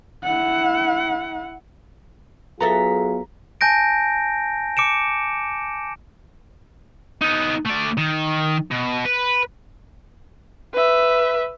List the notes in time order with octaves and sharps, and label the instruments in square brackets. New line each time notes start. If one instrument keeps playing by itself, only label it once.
[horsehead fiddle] E4 F#5
[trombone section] F#3 F4 G#4 [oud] B3 A4 E5 [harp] A#5 B6
[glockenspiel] G#5 A5 G6 A#6 D7
D6 C#7 D7 E7
[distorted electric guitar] B3 D#4
A3 D5
D#3
B2
B4
[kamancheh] B4 E5